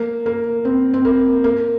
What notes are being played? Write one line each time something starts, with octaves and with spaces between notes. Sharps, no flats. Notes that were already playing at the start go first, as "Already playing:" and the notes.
Already playing: A#3
A#3
C4
C4
A#3
A#3